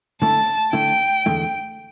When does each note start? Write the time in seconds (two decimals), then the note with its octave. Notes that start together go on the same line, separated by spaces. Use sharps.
0.21 D3 A3 E4 A5
0.73 D3 A3 E4 G5
1.26 E2 D3 A3 E4